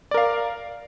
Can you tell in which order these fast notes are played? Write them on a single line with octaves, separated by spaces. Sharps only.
D5 A#4 F5